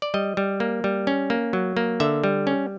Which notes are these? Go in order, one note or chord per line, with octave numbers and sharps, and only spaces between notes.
D5
G3 D#5
G3
A#3
G3
C#4
A#3
F#3
A#3
D3 E5
G3
C#4